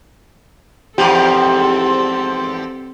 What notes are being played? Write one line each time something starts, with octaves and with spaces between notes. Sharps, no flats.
E2 G#2 F3 C4 G4 A4 C6